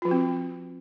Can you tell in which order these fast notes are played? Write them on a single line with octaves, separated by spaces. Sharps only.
F4 F3 F#4 C4